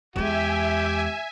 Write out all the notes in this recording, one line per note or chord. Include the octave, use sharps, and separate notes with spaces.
E2 G#3 G4 E5 G#5